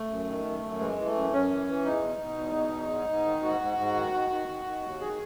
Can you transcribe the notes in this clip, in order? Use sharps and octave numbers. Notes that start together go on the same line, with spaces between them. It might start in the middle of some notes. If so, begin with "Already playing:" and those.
Already playing: A3
F#2
D#3
F#2
F#2
E3 G#3
E3
A3
F#2
F#2 C#4
E3
E3
E2 D#4
B2
B2
E2
B2
E2
G#2
G#2
D#3
G#2 F#4
G#2
G#2
D#3
D#3
D#3
D#3
D#3
D#2
D#3 G#4